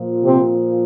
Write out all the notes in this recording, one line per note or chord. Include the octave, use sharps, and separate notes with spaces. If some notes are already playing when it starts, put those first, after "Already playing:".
Already playing: A#2 F3
C3 C4